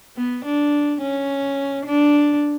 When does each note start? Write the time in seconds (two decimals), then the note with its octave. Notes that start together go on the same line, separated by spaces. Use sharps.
0.17 B3
0.45 D4
1.02 C#4
1.86 D4